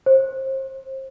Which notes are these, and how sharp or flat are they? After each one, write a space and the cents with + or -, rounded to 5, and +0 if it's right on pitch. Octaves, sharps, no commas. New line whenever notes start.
C5 +30